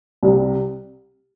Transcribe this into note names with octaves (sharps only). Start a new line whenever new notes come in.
C2 C3 G3